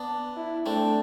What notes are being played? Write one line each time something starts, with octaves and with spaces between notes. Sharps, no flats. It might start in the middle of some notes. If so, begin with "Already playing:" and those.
Already playing: B3 D4
E4
A3 C4 D4